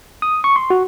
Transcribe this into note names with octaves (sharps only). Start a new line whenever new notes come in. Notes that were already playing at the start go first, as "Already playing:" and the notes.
D#6
C#6
C6
F#4